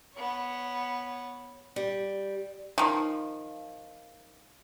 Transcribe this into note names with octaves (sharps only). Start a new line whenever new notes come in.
B3 C#5
G3
D#3 F3